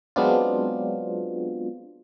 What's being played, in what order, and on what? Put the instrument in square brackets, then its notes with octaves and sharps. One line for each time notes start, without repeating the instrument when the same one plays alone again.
[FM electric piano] F#3 G#3 B3 C4 D4 F4